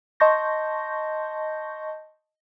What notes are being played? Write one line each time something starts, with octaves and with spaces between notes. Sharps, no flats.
D#5 A5 C6 C#6 G6 A#6